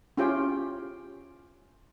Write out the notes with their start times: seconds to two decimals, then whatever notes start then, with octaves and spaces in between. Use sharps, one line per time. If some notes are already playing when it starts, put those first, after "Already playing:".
0.17 C#4 E4 F4 G4 G5